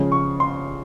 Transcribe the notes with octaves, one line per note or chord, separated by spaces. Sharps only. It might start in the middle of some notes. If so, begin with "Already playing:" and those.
Already playing: C#3 F3 G#3
C#6
C6